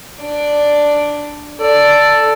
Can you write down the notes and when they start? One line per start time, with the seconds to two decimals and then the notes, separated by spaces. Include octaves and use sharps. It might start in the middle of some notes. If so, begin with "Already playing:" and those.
0.20 D4 D5
1.61 A4 D5